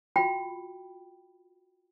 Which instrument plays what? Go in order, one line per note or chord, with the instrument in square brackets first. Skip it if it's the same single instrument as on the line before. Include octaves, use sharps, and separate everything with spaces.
[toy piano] F4 F#4 G5 B5